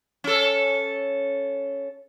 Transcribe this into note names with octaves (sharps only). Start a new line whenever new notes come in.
C#4 A4